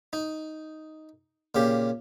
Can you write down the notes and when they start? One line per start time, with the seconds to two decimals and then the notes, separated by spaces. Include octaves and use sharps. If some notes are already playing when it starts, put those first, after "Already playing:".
0.13 D#4
1.55 A#2 C#3 G4